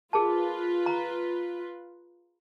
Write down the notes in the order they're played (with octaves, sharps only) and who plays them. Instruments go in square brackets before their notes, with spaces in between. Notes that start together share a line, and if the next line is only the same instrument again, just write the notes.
[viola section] F4 B4 [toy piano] G#4 A#4 A5
[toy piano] A#5